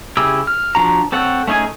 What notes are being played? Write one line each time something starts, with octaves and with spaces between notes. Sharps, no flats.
C#3 E4 G4 G#4 E6
F6
F3 D4 F#4 A#5
C4 A4 C#5 F#5
A3 C#4 D#4 G#4 G#5